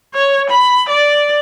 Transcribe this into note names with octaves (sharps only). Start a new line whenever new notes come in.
C#5
B5
D5